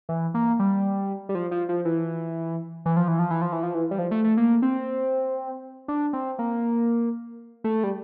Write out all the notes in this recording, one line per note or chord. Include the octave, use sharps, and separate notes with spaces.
E3
A#3
G3
G3
F3
F3
F3
E3
E3
F3
E3
F3
E3
F3
E3
F3
E3
G3
F3
A3
A3
A#3
C4
D4
C4
A#3
A3
G3